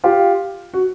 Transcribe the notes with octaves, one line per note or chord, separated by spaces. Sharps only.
F4 G4
F#4